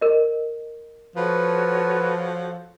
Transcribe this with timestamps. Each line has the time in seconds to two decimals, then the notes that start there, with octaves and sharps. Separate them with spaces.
0.01 A#4 D#5
1.16 F3 F#4 A4 B4 C#5